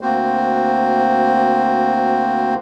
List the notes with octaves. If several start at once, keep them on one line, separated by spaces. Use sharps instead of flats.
D2 A#3 C4 F#4 C5